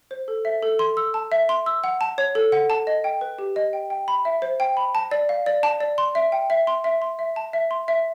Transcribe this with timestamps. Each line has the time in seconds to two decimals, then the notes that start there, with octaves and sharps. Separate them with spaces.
0.11 C5
0.28 A4
0.45 E5
0.62 A4
0.79 C6
0.97 E6
1.14 A5
1.32 E5
1.49 C6
1.66 E6
1.84 F#5
2.01 A5
2.18 C#5
2.35 A4
2.52 F#5
2.70 A5
2.87 D#5
3.04 G5
3.21 B4
3.39 G4
3.56 D#5
3.73 G5
3.90 G5
4.08 B5
4.25 E5
4.42 C5
4.60 G5
4.77 B5
4.95 A5
5.11 D5
5.29 F5
5.46 D5
5.63 A5
5.81 D5
5.98 C6
6.15 E5
6.32 G5
6.50 E5
6.67 C6
6.84 E5
7.02 C6
7.19 E5
7.36 A5
7.53 E5
7.71 C6
7.88 E5